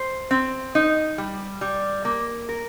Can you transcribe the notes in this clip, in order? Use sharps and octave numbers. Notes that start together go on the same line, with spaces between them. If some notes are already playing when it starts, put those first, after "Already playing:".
Already playing: C5
C4
D#4
G3
G3
A#3
A#4